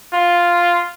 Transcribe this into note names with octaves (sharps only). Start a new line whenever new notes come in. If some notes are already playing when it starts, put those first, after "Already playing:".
F4